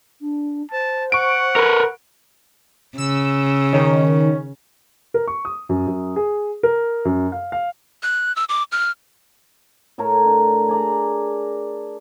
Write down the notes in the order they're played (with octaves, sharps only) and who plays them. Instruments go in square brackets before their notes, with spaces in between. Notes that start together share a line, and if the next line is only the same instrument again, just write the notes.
[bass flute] D4
[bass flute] C5 [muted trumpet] A5
[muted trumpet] F#5 [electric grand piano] C#6 D7
[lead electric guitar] A#4 B4
[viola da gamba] C#3 [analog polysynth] E6
[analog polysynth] D#3 [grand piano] C#4
[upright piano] A#4
C#6
D#6
F#2
F#2
G#4
A#4
F#2
F5
F5
[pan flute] F#6
E6
D6
F6
[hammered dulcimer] A2 A4 A#4 C#5
D4
G#4 D5 A#5